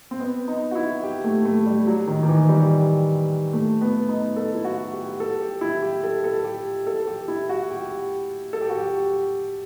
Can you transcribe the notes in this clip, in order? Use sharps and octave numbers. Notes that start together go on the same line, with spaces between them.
C4
B3
D#4
F#4
E4
G4
A3
A3
G3
F#3
D#3
D#3
E3
G3
A3
B3
D#4
A4
E4
F#4
G4
A4
G4
E4
G4
A4
A4
G4
A4
G4
E4
F#4
G4
A4
G4
F#4
G4